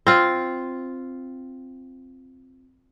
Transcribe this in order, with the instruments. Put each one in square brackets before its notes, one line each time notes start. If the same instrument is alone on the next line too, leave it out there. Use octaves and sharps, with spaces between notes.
[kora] C4 F4